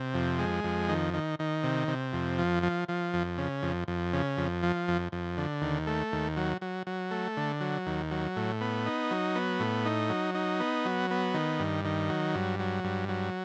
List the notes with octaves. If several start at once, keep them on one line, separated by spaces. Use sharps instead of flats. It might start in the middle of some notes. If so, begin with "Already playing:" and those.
Already playing: C3
F2
G#3
F2
D#3
D#3
D#3
C3
C3
F2
F3
F3
F3
F2
C#3
F2
F2
C#3
F2
F3
F2
F2
D3
D#2
A3
D#2
F#3
F#3
F#3
A3
D3
F#3
D#2
F#3
A2
B3
D#4
F#3
B3
A2
D#4
F#3
D#4
B3
F#3
B3
D#3
G2
D#3
F#3
G2
F#3
G2
F#3